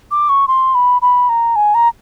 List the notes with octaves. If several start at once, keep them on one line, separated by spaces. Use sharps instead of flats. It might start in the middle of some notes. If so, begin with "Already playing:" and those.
D6
C#6
C6
B5
B5
A#5
G#5
A#5